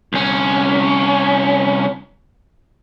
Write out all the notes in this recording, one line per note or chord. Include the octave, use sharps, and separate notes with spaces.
C2 C#4